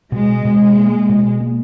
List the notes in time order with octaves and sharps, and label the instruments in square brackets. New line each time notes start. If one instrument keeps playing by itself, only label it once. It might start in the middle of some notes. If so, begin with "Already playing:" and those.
[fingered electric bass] B2 [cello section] G#3
[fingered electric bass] B2
A#3
B2
A#3